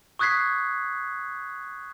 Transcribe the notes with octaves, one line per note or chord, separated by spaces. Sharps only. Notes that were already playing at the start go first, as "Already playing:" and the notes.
C#6 D#6 F#6 G#6 B6 C7